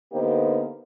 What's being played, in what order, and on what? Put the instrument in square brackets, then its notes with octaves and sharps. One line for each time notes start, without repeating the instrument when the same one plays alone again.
[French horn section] D3 A#3 B3 D#4 G4 C5